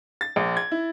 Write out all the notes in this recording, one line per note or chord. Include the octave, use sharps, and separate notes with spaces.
A6
A#1
G#6
E4